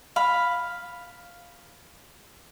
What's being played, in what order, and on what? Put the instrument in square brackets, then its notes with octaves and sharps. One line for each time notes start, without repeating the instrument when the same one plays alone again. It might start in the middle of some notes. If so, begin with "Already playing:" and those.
[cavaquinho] F5 B5